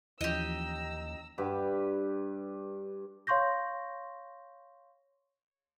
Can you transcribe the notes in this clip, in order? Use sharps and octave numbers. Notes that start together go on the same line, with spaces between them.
D#2 E3 F3 C#4 G4 D#5 A#5 E6
G2 G4 B4
C#5 F5 C6 C#6 G6 A#6